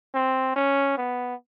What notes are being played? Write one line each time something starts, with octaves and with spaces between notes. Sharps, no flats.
C4
C#4
B3